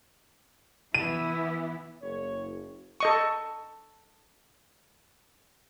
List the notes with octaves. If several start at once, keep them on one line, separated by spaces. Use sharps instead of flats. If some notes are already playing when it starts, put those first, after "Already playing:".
E3 B3 E4 D#7
F#1 C#5
A4 D#5 C#6